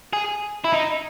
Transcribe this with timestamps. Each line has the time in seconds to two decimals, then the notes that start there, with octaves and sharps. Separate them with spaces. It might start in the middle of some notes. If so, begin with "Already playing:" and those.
0.13 G#4
0.64 E4
0.73 D#4